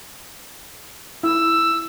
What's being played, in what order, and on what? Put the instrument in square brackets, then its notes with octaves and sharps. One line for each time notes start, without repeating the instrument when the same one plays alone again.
[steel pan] E4 [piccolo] E6